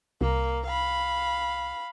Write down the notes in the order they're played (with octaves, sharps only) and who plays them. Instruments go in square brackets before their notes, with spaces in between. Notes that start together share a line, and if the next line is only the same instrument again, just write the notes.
[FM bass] C2 [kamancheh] A#3
[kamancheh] F5 B5